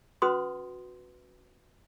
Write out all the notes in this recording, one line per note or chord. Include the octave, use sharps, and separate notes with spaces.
C#4 F#4 B4 C6 D#6